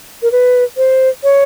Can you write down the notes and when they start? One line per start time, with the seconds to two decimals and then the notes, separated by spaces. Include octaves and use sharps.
0.22 A#4
0.32 B4
0.77 C5
1.23 C#5